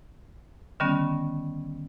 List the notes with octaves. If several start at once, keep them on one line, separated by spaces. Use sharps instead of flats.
D3 D#3 G3 B3 C#4